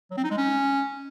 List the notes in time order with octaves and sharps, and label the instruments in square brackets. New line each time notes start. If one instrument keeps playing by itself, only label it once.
[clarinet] F#3
C4
D#4
G#3
C#4